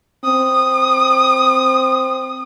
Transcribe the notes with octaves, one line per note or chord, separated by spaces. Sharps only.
C4 D#6